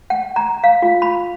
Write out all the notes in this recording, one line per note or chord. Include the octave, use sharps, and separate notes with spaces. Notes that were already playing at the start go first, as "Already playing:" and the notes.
F#5
A#5
F5
F4
B5